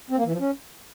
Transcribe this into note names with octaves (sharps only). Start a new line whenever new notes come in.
C4
A#3
E3
F3
C#4